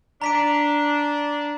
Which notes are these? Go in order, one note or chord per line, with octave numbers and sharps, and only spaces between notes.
D4 A#5 B6 D7